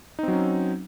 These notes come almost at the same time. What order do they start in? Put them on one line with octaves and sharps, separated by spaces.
D#4 C4 F#3 C#4